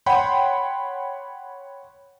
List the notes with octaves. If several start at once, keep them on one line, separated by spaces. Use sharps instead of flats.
C#5 F#5 G5 B5 C6